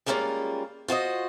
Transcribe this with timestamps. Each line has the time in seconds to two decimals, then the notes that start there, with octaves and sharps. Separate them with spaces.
0.06 G3 G#3 A#3 C#4 D#4 F4
0.88 F4 F#4 C5 D#5